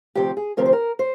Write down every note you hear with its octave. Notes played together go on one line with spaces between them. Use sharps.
D2 C3 F3 C4 G4
G#4
D2 C3 F3 C4 A#4
C5
A#4
C5